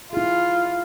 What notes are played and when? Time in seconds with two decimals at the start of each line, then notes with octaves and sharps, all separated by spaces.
0.13 E4 F4 G#4